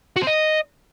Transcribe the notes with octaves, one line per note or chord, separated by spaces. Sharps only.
F#4
C4
D#5